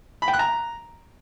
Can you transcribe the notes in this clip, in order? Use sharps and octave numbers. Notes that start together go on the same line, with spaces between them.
B5
G5
F#6
A#5